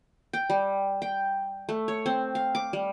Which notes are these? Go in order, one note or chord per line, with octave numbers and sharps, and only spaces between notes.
G5
G3
G5
A3
C#5
C4
F5
D6
G3